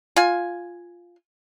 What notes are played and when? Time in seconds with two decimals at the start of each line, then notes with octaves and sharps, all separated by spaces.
0.16 F4 G#5